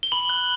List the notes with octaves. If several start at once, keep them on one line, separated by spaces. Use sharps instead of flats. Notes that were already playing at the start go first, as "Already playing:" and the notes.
G7
B5 F#7
F#6